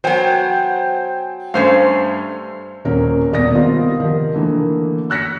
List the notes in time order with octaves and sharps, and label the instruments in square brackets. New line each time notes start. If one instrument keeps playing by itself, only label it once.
[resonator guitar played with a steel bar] F#3 B3 [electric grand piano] C5 G5 G#5
[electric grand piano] G2 A3 C6 [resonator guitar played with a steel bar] C#4 C5 F5
[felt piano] D#1 C4 C#4 A#4
D#1 C2 B2 D5 D#6 A#6
D#3 G3 B3 C4 F4
D#3 F3
D3 E3 A3 A#3
E6 F#6 A#6 B6 C#7